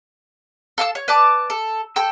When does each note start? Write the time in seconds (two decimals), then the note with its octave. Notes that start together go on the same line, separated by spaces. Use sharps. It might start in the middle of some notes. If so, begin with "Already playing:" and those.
0.78 A4 F5 A5 E6
0.95 C#5
1.08 B4 D5 A5 D6
1.50 A4
1.96 A4 G5 E6